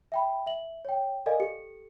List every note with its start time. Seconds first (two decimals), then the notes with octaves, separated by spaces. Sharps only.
0.12 E5 G5 B5
0.46 E5 F#7
0.85 C#5 G5
1.26 A4 A#4 D5 D#5 F5 G#5
1.40 G4 A4 C#7